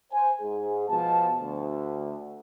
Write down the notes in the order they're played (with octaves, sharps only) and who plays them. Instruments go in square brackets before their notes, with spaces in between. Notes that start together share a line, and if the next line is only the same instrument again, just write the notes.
[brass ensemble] C5 G#5
G#2 G#4
B2 F3 A5
D2